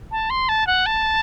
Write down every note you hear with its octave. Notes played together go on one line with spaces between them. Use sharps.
A5
C6
A5
F#5
A5